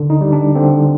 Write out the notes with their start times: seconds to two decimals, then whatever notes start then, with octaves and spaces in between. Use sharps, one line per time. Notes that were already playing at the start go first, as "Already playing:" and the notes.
Already playing: D3
0.10 D#4
0.21 G3
0.32 D4
0.55 D3 C4